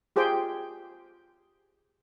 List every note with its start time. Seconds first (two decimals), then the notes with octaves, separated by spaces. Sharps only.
0.16 F4 G4 G#4 C5 G5